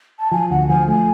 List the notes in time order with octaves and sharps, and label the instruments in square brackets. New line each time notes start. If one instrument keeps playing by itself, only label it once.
[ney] A5
[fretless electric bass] F3 [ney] G#5
[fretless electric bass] D2 [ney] F#5
[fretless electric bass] F3 [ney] G#5
[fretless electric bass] A3 [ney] G#5